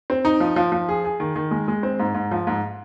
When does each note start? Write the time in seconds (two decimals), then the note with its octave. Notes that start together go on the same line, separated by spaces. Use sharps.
0.10 C4
0.25 D#4
0.40 F3
0.56 F3
0.72 F3
0.89 G#4
1.04 G#4
1.20 D#3
1.36 D#3
1.51 G#3
1.68 G#3
1.83 C4
2.00 G#2
2.15 G#2
2.31 F3
2.47 G#2